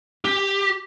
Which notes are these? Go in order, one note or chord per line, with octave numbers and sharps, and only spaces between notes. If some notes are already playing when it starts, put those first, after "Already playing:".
G4